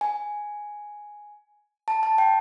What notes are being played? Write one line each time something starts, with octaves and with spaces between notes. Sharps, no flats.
G#5
A5
A5
G5